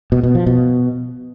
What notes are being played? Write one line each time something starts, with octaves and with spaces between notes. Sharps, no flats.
B2
B2
F3
B2